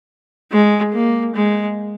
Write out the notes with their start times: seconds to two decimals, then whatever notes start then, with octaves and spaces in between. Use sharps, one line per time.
0.51 G#3
0.93 A#3
1.35 G#3